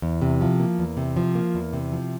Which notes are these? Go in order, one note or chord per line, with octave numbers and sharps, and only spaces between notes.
E2
C3
F3
A#3
E2
C3
F3
A#3
E2
C3
F3